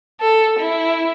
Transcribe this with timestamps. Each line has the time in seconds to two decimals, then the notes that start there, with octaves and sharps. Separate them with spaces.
0.21 A4
0.59 E4